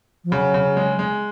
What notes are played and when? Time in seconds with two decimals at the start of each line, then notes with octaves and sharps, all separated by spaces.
0.24 F3
0.31 C#3 F#3
0.54 C#3
0.77 G#3
0.99 G#3